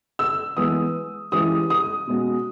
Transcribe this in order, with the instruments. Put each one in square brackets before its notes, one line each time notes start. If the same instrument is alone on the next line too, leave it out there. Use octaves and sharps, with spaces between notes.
[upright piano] E6
[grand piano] E3 G#3 B3 [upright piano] D#6
[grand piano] E3 G#3 C#4 E4 G4 [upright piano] D#6
[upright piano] D#6
[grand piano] B2 G#3 C#4 F#4